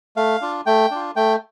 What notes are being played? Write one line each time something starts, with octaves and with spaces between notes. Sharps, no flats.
A3 F5
D4 F4
A3 G5
D4 F4
A3 G5